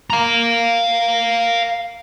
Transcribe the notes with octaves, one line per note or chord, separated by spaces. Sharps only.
F5 A#5